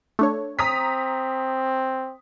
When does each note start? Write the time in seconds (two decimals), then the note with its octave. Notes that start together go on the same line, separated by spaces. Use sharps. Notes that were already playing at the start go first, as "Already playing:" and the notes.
0.19 A3 D4 C#5
0.59 C4 A#5 D#6 B6